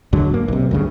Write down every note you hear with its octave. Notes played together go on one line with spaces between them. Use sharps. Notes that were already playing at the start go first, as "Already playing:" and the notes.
D#2 G#2 D3 F#3
A#3
B1 C3
D2 G2 C#3